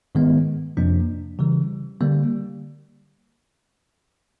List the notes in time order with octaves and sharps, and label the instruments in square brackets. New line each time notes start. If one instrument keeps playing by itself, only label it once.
[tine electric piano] G#2 D#3 G#3 B3
F2 C3 F3 A#3 D4
C#3 E3 G3
D3 G3 A#3